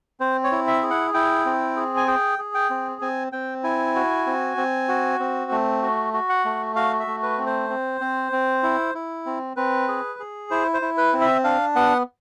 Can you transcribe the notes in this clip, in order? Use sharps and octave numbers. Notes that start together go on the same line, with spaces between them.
C4 C5
C#5
E4
E5
G#4
F#5
E4 G5
C4
G#4
G#5
G#4 G5
G#4
G5
C4
C4 G#5
C4 G5
E4 G#5
F#4
C4
C4
F#4
C4
A3
F#4
F#4
F#5
A3
F#4 F5
E5
A3
B4
C4
C5
C4
C4
C4
E4
E4
C4
C4 B4
G#4
G#4
E4 C5
C5
E4
B4
C4
E5
D4 F5
B3 F#5